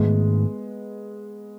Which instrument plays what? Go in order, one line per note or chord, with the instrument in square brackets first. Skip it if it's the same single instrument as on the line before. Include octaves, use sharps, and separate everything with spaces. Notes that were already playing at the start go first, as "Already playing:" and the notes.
Already playing: [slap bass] G#2 D#3 A3 C#4 [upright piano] G#3 B3